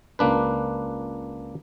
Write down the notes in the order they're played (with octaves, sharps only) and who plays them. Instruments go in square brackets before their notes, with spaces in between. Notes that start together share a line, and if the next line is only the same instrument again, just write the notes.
[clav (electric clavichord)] C#2 A#3 D4 B4